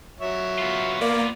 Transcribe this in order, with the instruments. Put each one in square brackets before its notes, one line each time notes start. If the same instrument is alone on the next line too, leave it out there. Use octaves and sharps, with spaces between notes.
[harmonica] F#3 C#5 E5
[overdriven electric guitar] B3 F4
[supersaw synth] A#3 [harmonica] D5